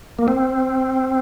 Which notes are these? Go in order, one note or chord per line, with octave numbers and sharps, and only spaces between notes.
A#3
C4